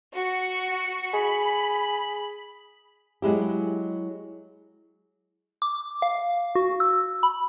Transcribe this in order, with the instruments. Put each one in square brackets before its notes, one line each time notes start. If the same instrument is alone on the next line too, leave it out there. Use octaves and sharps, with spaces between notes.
[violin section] F#4 C#7
[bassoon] G#4 [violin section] B5
[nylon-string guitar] F#3 G#3 E4 G4
[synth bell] D6
F5
F#4
E6
B5